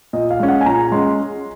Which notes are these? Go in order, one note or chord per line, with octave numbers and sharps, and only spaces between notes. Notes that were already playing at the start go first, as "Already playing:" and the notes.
A#2 D#5
F5
G#3 C#4
F#5
G#5
A#2 A#5
G#3 C#4 C6